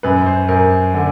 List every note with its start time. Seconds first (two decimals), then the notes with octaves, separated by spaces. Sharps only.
0.03 F#2 B4
0.26 C5
0.49 F#2 A#4
0.94 D3